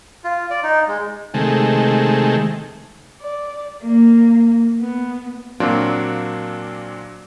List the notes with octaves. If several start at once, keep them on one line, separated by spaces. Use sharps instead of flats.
F4
D5
D#4
G#3
C3 D#3 G#3 A3
D5
A#3
B3
A#2 F#3 A#3 C4 D4 F4